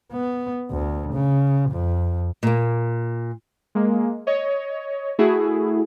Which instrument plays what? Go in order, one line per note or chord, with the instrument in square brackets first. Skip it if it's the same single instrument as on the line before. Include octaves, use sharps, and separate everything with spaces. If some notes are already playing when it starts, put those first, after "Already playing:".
[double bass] B3
D2
C#3
F2
[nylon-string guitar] A#2 A#3
[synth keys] G#3 A#3
C#5 D#5
A3 E4 F#4 G#4